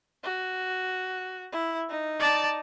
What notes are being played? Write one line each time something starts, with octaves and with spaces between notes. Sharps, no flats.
F#4
E4
D#4
D5 A5